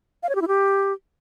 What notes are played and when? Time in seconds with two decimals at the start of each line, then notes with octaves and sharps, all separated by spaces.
0.23 F5
0.29 C#5
0.35 G4
0.42 E4
0.48 G4